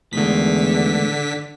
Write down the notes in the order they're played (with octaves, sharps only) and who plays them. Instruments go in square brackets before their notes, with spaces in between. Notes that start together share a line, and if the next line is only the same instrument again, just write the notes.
[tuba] E2 [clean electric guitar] A2 D#3 G#3 [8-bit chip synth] D3 B6